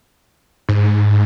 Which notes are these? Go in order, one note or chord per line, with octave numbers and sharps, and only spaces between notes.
G#2